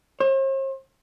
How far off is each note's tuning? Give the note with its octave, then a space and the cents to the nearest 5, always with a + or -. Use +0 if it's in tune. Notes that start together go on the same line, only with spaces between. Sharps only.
C5 +45